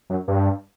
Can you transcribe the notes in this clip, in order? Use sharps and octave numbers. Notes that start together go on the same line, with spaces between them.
F#2
G2